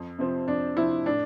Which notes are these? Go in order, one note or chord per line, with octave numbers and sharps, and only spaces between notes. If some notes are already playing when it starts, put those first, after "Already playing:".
Already playing: F2
C3 F3 C4
F2 D4
C3 F3 C4 E4
A2 D4